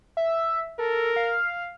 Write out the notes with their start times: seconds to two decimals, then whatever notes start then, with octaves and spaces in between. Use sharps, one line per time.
0.17 E5
0.79 A4 A#4
1.16 F5